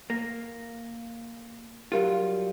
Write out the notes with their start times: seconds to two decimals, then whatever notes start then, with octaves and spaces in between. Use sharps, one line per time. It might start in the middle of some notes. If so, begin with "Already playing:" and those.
0.10 A#3 A#6
1.92 F#3 G3 F4 G4 A#4 F5